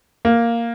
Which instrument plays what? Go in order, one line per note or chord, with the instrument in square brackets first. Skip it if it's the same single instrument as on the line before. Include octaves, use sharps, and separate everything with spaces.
[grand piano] A#3